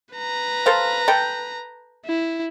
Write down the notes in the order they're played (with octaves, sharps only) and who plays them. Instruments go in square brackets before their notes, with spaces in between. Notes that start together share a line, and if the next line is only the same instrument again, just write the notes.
[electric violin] B4 A#5
[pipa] A4 C5 F5
A4 G5
[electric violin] E4